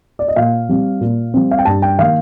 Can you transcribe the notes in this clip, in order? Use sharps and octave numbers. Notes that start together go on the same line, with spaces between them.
D5
D#5
A#2 F5
G3 C4
A#2
G3 C4
F5
G5
G2 A5
G5
D#3 A#3 F5